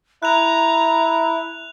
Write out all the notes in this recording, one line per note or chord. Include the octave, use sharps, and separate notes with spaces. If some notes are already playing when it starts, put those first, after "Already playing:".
E4 A#5 F#6 F7